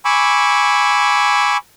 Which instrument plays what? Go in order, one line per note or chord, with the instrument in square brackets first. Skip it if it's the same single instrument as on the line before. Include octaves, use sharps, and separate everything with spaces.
[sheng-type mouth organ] G#5 B5 C#6 D6 E6